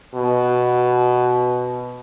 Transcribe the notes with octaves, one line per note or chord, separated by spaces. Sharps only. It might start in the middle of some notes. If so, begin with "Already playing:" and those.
B2